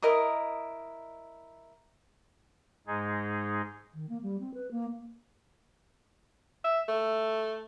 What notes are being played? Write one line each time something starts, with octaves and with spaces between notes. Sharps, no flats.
E4 A#4 D#5 D#6
G#2 G#3 D#4 G#4
D#3
A#3
G3
C4
B4
A#3
E5
A3